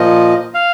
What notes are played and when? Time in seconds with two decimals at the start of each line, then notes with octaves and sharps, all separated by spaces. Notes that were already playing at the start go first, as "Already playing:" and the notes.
Already playing: A#2 F3 D#5
0.54 F5